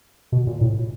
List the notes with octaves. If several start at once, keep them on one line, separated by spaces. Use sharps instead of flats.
B2
A#2
A2